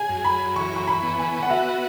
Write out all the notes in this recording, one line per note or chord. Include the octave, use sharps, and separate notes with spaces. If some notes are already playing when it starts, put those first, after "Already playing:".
Already playing: G#4 G#5
F#2
B5
E3 C#6
C#6
B5
B3
G#5
F#5
F#4 E5